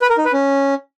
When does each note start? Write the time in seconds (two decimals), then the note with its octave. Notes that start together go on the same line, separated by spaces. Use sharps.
0.02 B4
0.10 A#4
0.17 D#4
0.25 B4
0.33 C#4